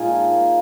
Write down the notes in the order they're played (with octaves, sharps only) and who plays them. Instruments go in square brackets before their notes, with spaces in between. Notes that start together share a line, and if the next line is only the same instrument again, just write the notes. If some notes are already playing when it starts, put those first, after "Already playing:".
Already playing: [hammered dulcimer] A#2 G#3 D#4 F4 G#4
F3
A#3